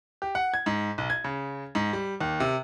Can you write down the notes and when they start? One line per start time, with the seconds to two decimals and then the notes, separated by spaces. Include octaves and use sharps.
0.22 G4
0.35 F#5
0.54 G#6
0.66 G#2
0.98 B1
1.10 G#6
1.24 C#3
1.75 G#2
1.93 G3
2.21 D#2
2.40 C3